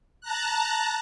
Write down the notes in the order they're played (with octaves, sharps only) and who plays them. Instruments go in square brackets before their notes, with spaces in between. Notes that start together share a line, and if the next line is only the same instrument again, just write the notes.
[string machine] A5 A#5 F#6